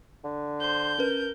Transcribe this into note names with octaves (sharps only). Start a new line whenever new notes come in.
D3
C5 G6
C#4 A#4 B4